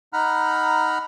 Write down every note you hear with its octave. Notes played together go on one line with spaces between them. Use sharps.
D#4 F#5 A#5 B5 F6